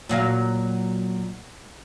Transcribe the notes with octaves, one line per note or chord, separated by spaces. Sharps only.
A#2 F#3 F5